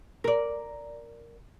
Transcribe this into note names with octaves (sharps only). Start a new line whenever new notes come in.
A#4 D5